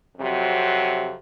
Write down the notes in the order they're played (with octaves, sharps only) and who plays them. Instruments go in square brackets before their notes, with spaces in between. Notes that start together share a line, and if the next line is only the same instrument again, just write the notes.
[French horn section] F2 C3 F#3